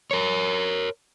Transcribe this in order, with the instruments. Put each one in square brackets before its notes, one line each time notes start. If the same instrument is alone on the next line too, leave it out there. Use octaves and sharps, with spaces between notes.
[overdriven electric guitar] A#4 C#5